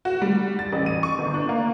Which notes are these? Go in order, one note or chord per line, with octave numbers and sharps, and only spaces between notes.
F#4
G3
A6
A1
D#7
C#6
G1
D4
A#3